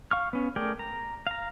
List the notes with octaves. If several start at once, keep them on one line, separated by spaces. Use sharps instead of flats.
F5 C#6 F6
B3 C#4
A3 G#4 A#4 D5 G5
A#5
F5 A#5